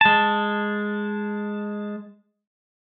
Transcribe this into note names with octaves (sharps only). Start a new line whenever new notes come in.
G#3 A5